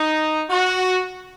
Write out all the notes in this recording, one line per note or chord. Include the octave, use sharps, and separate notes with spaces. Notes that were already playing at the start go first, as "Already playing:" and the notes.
Already playing: D#4
F#4